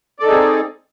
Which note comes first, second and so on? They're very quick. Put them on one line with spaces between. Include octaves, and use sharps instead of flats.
D5 A4 D#4 G#4 C4